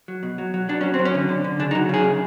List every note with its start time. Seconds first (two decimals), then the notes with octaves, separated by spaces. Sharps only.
0.08 F#3
0.23 B2
0.38 F#3
0.54 F#3
0.69 F#3 D4
0.81 F#3 C#4
0.94 C4
0.99 F#3
1.05 C#4
1.14 D3
1.29 D3
1.44 D3
1.59 C#3 D4
1.71 D#4
1.75 F#3
1.89 C#3 G#4
2.04 C#3